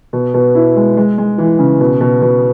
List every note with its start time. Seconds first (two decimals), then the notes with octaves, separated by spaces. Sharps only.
0.13 B2
0.34 B2
0.55 E4
0.76 G#3
0.97 G#3
1.18 G#3
1.38 E3
1.59 C#3
1.80 B2
2.01 B2
2.22 B2